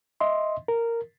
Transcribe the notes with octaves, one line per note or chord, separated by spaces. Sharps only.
D#5 E5 C6
A#4